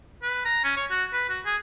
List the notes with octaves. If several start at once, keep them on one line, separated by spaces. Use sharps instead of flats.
B4
A#5
C#4
C#5
F#4
B4
F#4
G#4